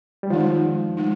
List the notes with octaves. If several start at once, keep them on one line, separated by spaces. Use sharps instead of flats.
G3
D#3 F3 G#3 D#4
G#3 D#4